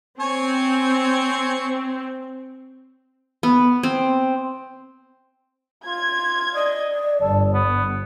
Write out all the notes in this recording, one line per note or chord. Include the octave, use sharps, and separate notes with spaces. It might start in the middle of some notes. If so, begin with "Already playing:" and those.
C4 C#5 G#5
B3
C4
F4 G#6
D5 D#5
G1 A4
B3